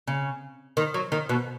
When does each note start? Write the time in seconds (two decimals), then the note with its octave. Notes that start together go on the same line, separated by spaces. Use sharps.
0.07 C#3
0.77 D#3
0.94 F#3
1.12 D#3
1.29 B2